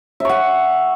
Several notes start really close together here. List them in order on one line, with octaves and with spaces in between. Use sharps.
E5 C#6 F#5